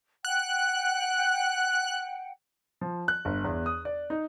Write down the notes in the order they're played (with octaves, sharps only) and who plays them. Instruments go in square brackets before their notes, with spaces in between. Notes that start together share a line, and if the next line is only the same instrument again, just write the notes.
[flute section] F#5 G5 [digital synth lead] F#6
[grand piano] F3
F#6
G1
E2
D#6
D5
D#4